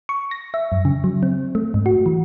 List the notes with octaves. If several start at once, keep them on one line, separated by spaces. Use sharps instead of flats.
C#6
A#6
E5
F#2
C#3
F#3
C4
A3
G#2
F#4
E3